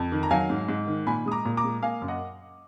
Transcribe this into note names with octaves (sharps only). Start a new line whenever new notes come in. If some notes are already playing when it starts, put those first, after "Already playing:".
Already playing: F2
D#3
A#5
F#3 F5 G#5
G#2
G#2
D#3
A#2 G#5 B5
G#3 D#6
A#5 D6
A#2
A#5 D6
G#3
A#3 F5 G#5
F#2
D#5 F#5